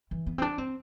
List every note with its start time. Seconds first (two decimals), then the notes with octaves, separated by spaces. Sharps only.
0.11 E3
0.26 B3
0.38 C4
0.42 D4
0.58 C4